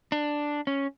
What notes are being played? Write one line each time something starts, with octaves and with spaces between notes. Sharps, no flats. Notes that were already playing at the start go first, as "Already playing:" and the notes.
D4
C#4